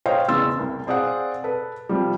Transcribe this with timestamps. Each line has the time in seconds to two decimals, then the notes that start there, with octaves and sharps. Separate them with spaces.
0.06 A4 C5 C#5 D#5 F5 G5
0.28 E2 C#3 C6 E6 A6
0.59 C2
0.87 C4 G#4 D5 F5 F#5
1.44 A4 B4
1.89 C3 F3 G3